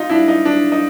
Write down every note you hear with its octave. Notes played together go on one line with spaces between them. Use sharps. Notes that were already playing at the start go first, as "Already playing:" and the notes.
Already playing: D#4 F4
D4 E4
D#4
D4
D#4